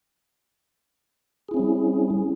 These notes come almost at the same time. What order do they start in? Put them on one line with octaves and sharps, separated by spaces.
G#4 E4 C4 C#4 G3